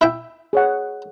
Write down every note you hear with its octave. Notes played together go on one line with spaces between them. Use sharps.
E4 E5 G5
G#4 C#5 F#5